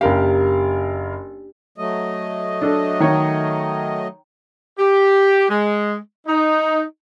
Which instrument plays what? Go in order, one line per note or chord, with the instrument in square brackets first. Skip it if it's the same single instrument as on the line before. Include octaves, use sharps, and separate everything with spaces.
[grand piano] F#1 A#4 F5 [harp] D4 G4
[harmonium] F#3 A3 D#5
[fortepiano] D4 A4
D#3 C#5
[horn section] G4
G#3
D#4